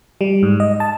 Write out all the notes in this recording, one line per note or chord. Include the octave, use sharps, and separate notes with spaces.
G3
G#2
D#5
A5